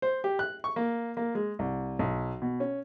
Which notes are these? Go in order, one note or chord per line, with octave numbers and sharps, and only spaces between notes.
C5
G4
F#6
C#6
A#3
A#3
G#3
C2
B1
B2
C#4